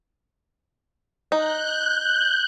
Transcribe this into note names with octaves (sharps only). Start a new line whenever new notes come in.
D#4 F#6 G6